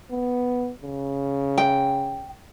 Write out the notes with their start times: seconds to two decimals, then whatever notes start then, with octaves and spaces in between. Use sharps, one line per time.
0.11 B3
0.83 C#3
1.58 G5